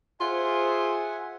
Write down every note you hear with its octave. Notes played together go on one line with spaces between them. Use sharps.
F4 G#4 C5 E5 F#5 G#5